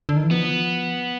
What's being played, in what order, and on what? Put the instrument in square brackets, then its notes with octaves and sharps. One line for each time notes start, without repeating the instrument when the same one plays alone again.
[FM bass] D3
D#3
E3
[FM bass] F3 [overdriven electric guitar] B3